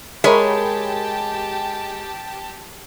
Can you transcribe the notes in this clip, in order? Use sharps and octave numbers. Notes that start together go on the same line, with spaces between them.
G#3 G4 A#4 C#5 A5 B5